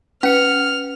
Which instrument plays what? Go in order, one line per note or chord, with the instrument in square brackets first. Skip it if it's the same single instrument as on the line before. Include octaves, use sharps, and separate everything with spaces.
[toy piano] C#4 [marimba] B4 [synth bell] F#5 C#7 [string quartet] F6